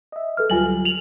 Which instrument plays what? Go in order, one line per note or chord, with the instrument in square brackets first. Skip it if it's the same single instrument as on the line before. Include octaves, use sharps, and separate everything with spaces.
[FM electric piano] D#5 E5
[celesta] A4 B4 F6
[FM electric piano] D2 F#3 G3 [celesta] F4 G#5 F#7
[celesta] F7 F#7